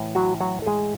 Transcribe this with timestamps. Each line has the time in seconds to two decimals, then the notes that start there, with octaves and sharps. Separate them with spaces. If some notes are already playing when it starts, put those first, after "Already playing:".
Already playing: A2 E3
0.15 F#3 F#4
0.41 F#3 F#4
0.62 A4
0.66 G#3 G#4